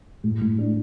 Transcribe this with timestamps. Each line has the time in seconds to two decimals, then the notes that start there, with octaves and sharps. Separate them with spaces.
0.24 A2
0.41 A2
0.58 D4